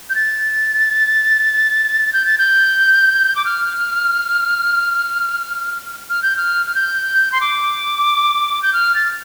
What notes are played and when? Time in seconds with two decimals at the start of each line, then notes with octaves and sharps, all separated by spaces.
0.10 G6
0.15 A6
2.13 G6
2.26 A6
2.38 G6
3.36 D6
3.45 F6
6.10 F6
6.23 G6
6.37 F6
6.66 F6
6.75 G6
7.32 C6
7.41 D6
8.62 G6
8.73 F6
8.95 A6